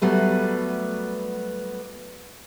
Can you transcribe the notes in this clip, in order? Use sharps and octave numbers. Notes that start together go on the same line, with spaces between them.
F#3 G3 A3 B3